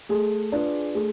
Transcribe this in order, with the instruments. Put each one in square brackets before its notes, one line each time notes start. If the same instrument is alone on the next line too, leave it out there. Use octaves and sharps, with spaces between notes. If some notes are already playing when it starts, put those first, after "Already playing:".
[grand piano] A3 [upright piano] G#4
[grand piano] D4 F4 B4
[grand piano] A3 [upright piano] G#4